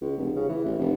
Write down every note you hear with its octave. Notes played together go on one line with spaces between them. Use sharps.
C#2
F1
C#3
E3
A1
F1